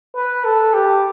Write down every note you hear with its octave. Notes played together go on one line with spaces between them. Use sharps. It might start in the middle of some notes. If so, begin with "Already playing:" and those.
B4
A4
G4